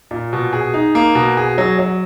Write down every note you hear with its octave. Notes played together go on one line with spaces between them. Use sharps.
A#2
B2
G#4
D#4
A#3
B2
G#4
F#3
F#3